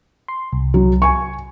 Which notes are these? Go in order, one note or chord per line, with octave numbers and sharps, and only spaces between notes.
C6
C2
F#3
G#5 C#6